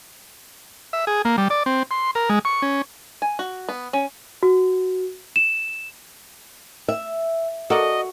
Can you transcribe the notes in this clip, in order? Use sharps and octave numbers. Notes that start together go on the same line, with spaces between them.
E5
G#4
A#3
G3
D5
C4
C6
A#4
G#3
C#6
C#4
G#5
F#4
B3
C#4
F#4
E7
E5
F#4 A4 A#4 D5 D#5